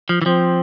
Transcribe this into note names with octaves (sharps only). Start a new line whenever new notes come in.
F3
E3
F3 C4